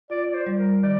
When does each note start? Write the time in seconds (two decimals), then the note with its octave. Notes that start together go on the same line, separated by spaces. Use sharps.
0.10 F4 D5
0.25 D5
0.34 C5
0.46 G3
0.58 A#4
0.83 D#3 D5